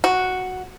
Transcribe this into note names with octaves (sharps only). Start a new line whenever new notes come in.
F#4